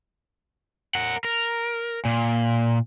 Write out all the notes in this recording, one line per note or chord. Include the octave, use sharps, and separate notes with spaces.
A#4 F#5
A#4
A#2